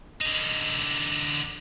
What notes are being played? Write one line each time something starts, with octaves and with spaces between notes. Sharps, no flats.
D3 D#4